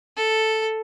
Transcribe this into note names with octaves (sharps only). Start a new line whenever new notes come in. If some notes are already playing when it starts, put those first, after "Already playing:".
A4